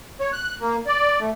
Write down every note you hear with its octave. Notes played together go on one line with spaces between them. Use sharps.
C#5
F#6
A#3
D5
A3